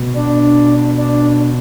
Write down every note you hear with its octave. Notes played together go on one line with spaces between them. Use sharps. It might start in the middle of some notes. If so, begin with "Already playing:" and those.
Already playing: B2
D4
D4